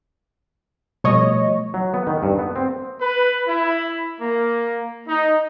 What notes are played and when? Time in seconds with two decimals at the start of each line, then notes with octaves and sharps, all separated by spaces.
1.04 B2 F3 G3 A3 C#5 D#5
1.74 F#3
1.94 B3
2.07 D#3
2.23 G2
2.39 B3
2.56 C4
3.00 B4
3.48 E4
4.20 A#3
5.07 D#4